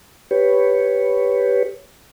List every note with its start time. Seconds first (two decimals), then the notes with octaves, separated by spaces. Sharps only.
0.31 G4 B4 C#5